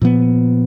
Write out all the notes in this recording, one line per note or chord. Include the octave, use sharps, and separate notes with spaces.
A#2 F3 B3